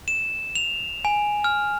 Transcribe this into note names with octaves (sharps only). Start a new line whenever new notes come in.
E7
F7
G#5
F6